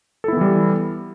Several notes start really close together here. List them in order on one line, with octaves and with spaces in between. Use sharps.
A4 E4 B3 E3 G3